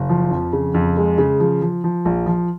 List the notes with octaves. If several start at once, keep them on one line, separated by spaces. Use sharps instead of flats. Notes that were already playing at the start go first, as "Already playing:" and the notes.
Already playing: F#1
F3
F2
C#3
F2
G#3
C#3
F3
F3
F3
A#1
F3